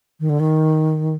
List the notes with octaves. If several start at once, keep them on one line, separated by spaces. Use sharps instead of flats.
D#3
D3
D#3